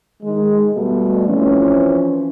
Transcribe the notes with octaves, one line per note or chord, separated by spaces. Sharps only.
D#3 G#3
B2 G3 A3
E3 F3 C4 C#4